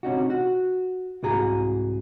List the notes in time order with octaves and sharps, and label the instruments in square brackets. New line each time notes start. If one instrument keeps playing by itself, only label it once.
[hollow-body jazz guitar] C3 C#4 D#4 F#4
F#4
C2 G#2 F#4 G#4 A#5